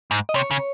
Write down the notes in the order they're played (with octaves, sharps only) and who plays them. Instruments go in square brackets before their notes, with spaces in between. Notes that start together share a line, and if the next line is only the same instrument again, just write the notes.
[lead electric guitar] G#2
[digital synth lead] D#5
[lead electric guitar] C3 [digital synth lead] C#5
[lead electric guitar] C#3